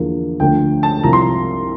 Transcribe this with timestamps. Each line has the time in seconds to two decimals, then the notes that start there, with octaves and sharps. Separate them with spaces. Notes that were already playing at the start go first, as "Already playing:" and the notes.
Already playing: E2 D3 F3 A#3
0.40 D2 D3 F3 A3 G5
0.83 A5
1.04 C2 C3 F3 A#5
1.13 C6
1.22 A#5